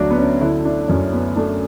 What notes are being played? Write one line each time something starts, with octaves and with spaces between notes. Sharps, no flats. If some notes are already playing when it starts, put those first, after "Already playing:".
Already playing: D2 F#3 D4 F#4
B3
C#4
D3 E4
D4
F#2 C#4
B3
A3 D4